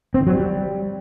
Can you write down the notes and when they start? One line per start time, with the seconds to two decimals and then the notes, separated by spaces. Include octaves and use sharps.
0.14 C4
0.21 D#3
0.27 F#3
0.33 G3